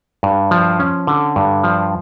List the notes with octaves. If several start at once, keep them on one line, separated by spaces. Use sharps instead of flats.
G2
F3
C#4
D3
G2
F3